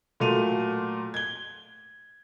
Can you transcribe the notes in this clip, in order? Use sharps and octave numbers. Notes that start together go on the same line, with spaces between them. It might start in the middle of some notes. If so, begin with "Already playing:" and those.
A#2 F#3 A3 C6 D#7 F7
G#6 G7